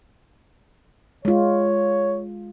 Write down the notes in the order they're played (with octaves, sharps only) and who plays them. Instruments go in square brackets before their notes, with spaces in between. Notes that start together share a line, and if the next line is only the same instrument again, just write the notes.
[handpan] G#3 F4 [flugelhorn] C#5